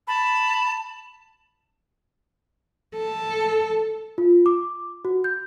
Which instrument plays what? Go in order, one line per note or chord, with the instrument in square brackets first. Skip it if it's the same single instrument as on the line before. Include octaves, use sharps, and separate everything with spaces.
[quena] A5 [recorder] B5
[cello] A4
[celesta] F4
D6
F#4
G6